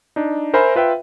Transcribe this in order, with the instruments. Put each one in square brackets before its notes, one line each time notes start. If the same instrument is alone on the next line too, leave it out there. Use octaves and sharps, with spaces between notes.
[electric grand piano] D4 D#4
A#4 C5 E5 G#5 B5
F4 B4 E5 G5